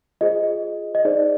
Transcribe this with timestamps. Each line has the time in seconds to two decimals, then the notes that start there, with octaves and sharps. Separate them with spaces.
0.21 F4 G#4 C5 D#5
0.95 D#5
1.05 D#4 G#4 C5 D5